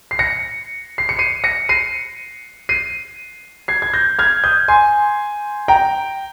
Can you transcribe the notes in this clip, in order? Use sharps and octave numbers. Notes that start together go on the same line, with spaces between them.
C7
A#6 C#7
C7
C#7
C7 D#7
A#6 C#7
C7 D#7
C7 D#7
G#6 C7
G#6
G6 A#6
F6 G#6
D#6 G6
G#5 C6
G5 A#5